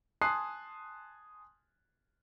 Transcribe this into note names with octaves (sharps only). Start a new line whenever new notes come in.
G#5 A5 C6 D#6 F#6 C7